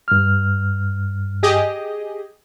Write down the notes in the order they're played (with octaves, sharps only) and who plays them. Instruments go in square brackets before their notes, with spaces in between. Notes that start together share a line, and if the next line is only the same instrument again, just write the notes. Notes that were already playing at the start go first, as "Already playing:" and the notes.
[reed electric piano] G2 F6
[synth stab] G4 G#4 D#5